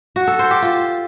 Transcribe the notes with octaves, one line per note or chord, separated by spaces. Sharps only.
F#4
A4
C5
G4
F4